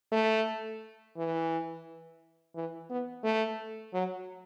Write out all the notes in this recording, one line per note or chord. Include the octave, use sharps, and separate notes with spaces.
A3
E3
E3
B3
A3
F#3